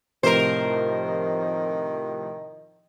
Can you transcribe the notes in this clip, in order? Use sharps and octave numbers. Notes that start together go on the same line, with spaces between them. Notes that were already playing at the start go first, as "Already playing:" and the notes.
A2 C3 D#3 F3 A#4 C5